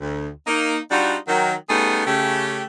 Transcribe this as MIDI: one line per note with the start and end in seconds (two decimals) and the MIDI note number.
0.01 0.29 38
0.47 0.78 58
0.47 0.78 63
0.91 1.16 55
0.91 1.16 62
0.91 1.16 63
0.91 1.16 65
0.91 1.16 66
1.28 1.54 51
1.28 1.54 54
1.69 2.05 55
1.69 2.05 57
1.69 2.05 59
1.69 2.05 61
1.69 2.05 63
1.69 2.05 68
2.06 2.63 49
2.06 2.63 57
2.06 2.63 67